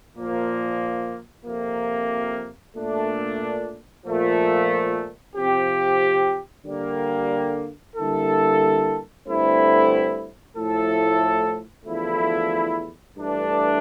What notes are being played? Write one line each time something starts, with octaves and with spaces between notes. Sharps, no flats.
A#2 F3 A#3
F2 C3 F3 A#3
A#2 A3 D4
A#2 F3 A3
C3 F3 C4 G4
D3 G3 A#3
D3 G3 A#3 E4 A4
G2 D3 A3 C4 E4
A2 F3 A3 E4 A4
E2 D3 F3 A3 E4
G2 E3 A3 D4